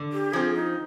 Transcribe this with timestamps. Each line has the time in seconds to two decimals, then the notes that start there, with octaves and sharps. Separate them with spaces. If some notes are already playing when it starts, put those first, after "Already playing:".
Already playing: D3
0.13 G4
0.33 F3 C4 G#4
0.54 D#4